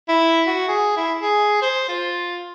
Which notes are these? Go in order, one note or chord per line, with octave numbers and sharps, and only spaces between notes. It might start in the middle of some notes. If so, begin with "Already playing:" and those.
E4
F#4
G#4
E4
G#4
C5
F4